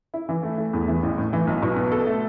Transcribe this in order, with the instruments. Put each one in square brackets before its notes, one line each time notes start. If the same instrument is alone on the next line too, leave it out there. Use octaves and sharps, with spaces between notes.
[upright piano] E4
E3
A3
A3
E2
E3
A1
A2
E3
B1
B2
B3
A4
A3